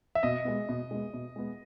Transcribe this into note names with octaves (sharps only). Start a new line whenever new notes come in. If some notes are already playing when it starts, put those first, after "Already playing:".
E5
B2 D#5
G#3 B3
B2
G#3 B3
B2
G#3 B3